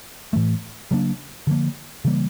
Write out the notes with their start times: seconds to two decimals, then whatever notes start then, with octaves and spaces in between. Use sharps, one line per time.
0.33 A2 E3 A3
0.91 C#3 F#3 A#3 D4
1.47 D3 F3 A#3
2.05 C#3 E3 G3 A#3